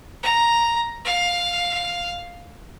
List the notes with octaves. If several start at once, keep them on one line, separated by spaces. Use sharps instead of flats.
A#5
F5